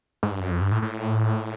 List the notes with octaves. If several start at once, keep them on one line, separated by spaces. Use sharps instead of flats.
G#2
G2
F#2
F2
G2
A2
A2